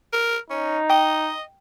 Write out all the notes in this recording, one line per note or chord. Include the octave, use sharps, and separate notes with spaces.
A#4
C#4 D#4
D#5 G5